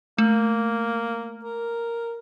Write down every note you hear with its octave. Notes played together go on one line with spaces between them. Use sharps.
A3 A#3
A#4